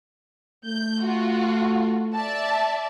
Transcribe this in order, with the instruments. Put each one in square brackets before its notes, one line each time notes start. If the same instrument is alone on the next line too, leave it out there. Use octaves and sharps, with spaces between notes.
[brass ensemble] A3 [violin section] G6
[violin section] F4 F#4
D5 E5 A5